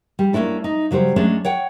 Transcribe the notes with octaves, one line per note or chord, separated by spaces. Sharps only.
G3
A#3 C#4 D4 E4 A4
D#4
C#3 F#3 G3 C5
F#3 G#3 A3 C#4 D4
C#5 F#5 G5